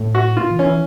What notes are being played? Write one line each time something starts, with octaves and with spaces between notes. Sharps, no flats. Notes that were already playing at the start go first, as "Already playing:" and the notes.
Already playing: A2
F#4
A#2 F4
E3
C#4
E3